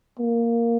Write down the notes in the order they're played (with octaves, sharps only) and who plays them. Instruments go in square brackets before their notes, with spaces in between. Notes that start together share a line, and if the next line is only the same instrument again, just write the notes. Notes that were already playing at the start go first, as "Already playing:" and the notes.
[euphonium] A#3